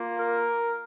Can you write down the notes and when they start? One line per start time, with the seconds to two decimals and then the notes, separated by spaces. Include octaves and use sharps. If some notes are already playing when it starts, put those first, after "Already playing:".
Already playing: A#3 F4
0.20 A#4